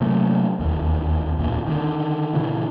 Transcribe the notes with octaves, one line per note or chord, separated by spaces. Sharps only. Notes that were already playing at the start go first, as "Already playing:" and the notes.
C3 F#3 A3 A#3
E1 D#2
D1 E2 A#2
D3 D#3
A#2 C#3 E3